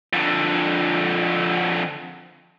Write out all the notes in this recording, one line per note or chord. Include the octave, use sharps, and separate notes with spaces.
F2 D3